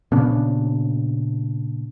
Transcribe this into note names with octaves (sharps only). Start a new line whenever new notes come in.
A#2 C#3 B3 D4